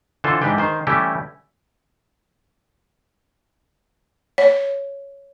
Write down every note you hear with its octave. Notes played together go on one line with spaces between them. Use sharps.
D3 E3 F4 A4 C5
G#2 E3 D4 G4 B4 G5
D#3 C5
E3 G3 A3 C#4 E4 G4
C#5